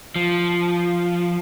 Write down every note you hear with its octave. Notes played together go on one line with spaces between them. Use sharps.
F3